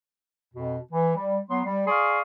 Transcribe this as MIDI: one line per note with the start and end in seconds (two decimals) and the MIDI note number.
0.54 0.78 41
0.54 0.78 47
0.92 1.16 52
1.16 1.39 55
1.50 1.61 54
1.50 1.61 59
1.50 1.61 84
1.65 1.85 55
1.87 2.20 68
1.87 2.20 74
1.87 2.20 77
1.87 2.20 84
1.87 2.20 85
1.87 2.20 87